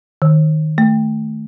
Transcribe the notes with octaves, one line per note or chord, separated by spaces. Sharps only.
D#3
A3